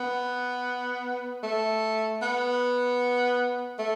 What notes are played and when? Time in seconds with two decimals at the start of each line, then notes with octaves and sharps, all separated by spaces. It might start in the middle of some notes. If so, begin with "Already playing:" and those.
Already playing: B3
1.43 A3
2.22 B3
3.79 A3